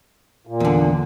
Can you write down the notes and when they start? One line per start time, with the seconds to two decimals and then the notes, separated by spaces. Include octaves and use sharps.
0.47 A#2
0.60 E2 D3